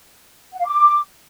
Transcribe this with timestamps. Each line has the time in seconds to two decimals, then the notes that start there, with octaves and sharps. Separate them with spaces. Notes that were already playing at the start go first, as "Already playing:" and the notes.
0.53 F#5
0.59 F5
0.66 D6